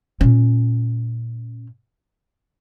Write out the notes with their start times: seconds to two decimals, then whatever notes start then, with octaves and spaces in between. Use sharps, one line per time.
0.21 A#2 C#4